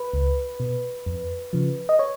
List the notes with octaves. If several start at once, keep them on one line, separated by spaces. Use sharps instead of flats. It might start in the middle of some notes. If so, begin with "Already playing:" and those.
Already playing: B4
C#2
B2
F2
C#3 F3
D#5
C#5